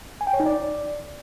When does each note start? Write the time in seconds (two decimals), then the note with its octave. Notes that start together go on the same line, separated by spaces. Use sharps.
0.21 G#5
0.27 G5
0.33 C#5
0.40 D#4
0.46 D5